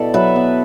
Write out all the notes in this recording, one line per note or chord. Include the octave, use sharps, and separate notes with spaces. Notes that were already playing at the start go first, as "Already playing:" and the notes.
Already playing: B2 E4 A4 D5
F#3 B4 E5
B3